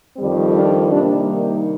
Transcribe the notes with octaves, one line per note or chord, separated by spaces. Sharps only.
F2 D#3 G3 C4
D4 F4
C3 D#3 G3 A#3 D4
D#4